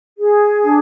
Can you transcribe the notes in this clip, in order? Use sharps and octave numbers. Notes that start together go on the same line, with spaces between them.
G#4
D4